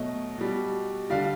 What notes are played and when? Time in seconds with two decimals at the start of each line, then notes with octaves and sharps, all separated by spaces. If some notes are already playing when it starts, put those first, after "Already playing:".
Already playing: B2 F#3 A3 D#5
0.38 B2 G3
1.10 D3 G3 F5